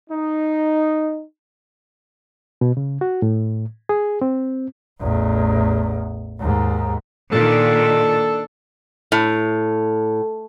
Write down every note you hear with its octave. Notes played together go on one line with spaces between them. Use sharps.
D#4
B2
C#3
F#4
A2
G#4
C4
A1 E2
D#2 G#2
A#2 D#3 D4 A4
A2